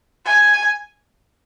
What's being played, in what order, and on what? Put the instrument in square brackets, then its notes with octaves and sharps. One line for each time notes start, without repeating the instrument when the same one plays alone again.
[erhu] G#5